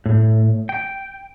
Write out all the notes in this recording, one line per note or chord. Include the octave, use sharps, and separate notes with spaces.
A2
G5